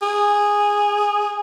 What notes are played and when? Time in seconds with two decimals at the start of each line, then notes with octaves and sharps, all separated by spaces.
0.02 G#4